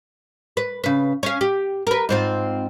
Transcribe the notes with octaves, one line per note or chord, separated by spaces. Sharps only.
B4
C#3 B4
C#4 F5
G4
A#4 B4
G#2 C4 F4